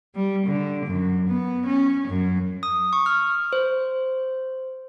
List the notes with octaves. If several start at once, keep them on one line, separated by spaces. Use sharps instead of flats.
G3
D3
F#2
B3
C#4
F#2
D#6
C#6
F6
C5